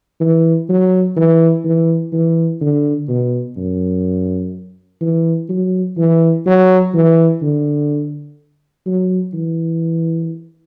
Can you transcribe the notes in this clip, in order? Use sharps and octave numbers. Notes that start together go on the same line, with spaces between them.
E3
F#3
E3
E3
E3
D3
B2
F#2
E3
F#3
E3
F#3
E3
D3
F#3
E3